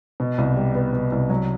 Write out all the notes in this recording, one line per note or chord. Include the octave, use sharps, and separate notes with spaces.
B2
C2
G3
B3
B2
C2
F#3